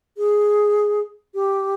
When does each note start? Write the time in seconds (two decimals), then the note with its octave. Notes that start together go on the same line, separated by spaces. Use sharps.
0.17 G#4
1.34 G4